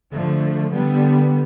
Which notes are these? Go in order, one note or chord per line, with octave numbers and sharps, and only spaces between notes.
D3 F3 A3
D3 G3 B3